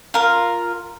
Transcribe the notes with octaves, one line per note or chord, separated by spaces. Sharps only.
F4 A#4